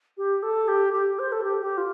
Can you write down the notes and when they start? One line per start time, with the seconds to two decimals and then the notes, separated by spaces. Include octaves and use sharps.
0.17 G4
0.43 A4
0.68 G4
0.93 G4
1.19 C5
1.32 A4
1.44 G4
1.61 G4
1.77 F4